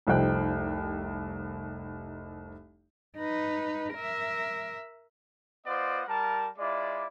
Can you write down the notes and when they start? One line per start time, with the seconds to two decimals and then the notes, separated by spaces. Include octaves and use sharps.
0.07 F1 C2 F3 D#4 G5 F#6
3.18 D#4 B4
3.94 A#4 E5
5.66 B3 F4 C5 D5 D#5 F#5
6.08 G3 A#4 A5
6.58 G#3 E4 F4 D5